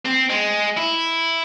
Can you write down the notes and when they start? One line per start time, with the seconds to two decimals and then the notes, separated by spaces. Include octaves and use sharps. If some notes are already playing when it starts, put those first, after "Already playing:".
0.05 C4
0.30 G#3
0.77 E4